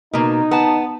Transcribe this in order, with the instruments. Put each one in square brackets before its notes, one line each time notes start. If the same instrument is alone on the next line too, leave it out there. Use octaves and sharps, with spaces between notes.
[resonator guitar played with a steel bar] B2 A#3 [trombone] D#4
[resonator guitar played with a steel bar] B3 A5